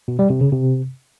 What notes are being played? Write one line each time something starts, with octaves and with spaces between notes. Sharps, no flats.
B2
G3
C3
C#3
C3